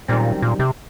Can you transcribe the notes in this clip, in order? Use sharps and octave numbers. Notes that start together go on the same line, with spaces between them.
F#2 A#2 D#3 G3 C4
A#2
C3